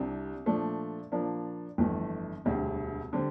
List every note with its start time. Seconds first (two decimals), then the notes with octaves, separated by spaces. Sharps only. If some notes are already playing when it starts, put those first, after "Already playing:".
Already playing: C2 C3 G3 D4
0.46 A#2 F3 A3 D4
1.12 A#2 F3 A#3 D4
1.78 G1 F2 E3 A3
2.45 E1 D2 C3 G3
3.13 D3 G3 C4